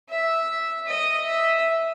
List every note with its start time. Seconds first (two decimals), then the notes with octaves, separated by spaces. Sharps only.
0.09 E5
0.87 D#5
1.26 E5